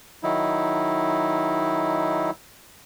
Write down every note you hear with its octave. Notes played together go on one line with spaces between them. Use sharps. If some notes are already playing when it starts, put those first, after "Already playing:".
D#3 F#3 D#4 E4